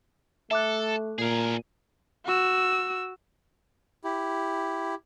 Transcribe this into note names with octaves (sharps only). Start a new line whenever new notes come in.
A3 A4 E5 D6 F#6
A#2 G#4 A#4
F#4 E6
E4 G4